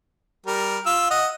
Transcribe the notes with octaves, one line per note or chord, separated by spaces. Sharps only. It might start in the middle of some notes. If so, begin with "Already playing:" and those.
G3 A#4
F4 E6
D#5 F#5